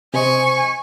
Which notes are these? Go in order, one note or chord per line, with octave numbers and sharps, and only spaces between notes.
C3 C5 D#5 G#5 C#6